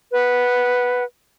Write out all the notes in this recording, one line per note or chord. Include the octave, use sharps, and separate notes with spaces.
B4 F#5